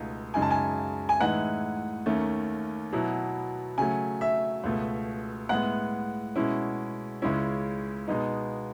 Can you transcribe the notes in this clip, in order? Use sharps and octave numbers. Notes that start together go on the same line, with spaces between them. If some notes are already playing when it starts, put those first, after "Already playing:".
Already playing: C#2 B2 A3 D#4
F#2 C#3 G#3 D#4 G#5
A5
G#5
G#5
A2 E3 G#3 D#4 F#5
D#2 D#3 A3 C#4
B2 F#3 B3 E4
C#3 F#3 A3 G#5
E5
C#2 B2 A3
A2 G#3 B3 F#5
B2 G#3 C#4 E4
C#2 C#3 G#3 C#4 E4
B2 G#3 B3 D#4